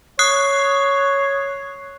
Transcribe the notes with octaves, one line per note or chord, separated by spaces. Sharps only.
C#5 D#6 F#6 C7